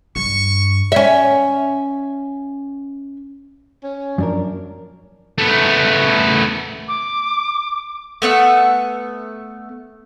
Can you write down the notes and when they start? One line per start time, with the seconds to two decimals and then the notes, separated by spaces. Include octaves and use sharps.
0.16 G2 C#6
0.92 C#4 E5
3.84 C#4
4.18 F#2 F3 D4 A#4
5.38 A3 B3
6.88 D6
8.22 A3 B3 F#5 E6